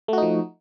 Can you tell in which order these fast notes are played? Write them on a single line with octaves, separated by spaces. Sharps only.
A3 F#4 D#4 F3